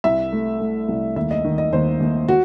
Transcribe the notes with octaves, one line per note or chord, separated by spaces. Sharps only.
C2 E5
A3
A3
C2
D#2 E5
D#5
D#3
D#5
D#2 C5
D#2
F#4